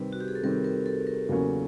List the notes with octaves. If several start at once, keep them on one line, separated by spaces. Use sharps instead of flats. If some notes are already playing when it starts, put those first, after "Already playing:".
Already playing: C3 D#3 G3 C4 B4
F#4
G4
G#4
A4
C3 D#3 G3 C4 A#4
A#4
A4
A#4
E2 C#3 F#3 A#3 C#4